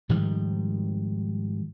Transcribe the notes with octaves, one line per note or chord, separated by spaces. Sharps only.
G#2 D#3 F3 G3